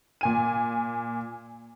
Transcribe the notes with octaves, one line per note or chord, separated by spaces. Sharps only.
A#2 G#5 D#7